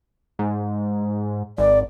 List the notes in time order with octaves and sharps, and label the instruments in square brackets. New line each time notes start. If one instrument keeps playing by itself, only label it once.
[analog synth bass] G#2
[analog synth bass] G#1 [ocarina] D5